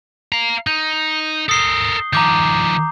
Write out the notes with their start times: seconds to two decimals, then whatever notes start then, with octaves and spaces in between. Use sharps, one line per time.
0.32 F5 A#5
0.67 D#4 G6
1.49 A4 A#4 D#6 C7 G7
2.13 D#3 F3 A#5 D6 G6